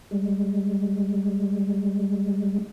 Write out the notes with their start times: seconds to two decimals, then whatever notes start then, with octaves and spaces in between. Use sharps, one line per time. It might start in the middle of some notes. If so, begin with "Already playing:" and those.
0.11 G3 G#3